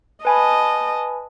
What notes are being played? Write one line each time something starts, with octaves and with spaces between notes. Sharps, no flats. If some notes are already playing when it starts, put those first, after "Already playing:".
B4 D#5 G#5 A5 B5